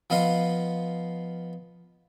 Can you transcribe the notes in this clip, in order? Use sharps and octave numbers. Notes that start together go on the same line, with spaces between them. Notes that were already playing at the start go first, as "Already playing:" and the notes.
F3 B3 D#5 F5 C6